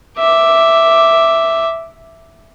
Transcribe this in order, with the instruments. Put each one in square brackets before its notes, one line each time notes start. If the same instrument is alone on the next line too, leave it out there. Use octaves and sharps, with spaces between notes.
[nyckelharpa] E5 D6